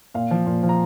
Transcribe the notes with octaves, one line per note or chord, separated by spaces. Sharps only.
A#2 F5
F3
A#2
F3
A#5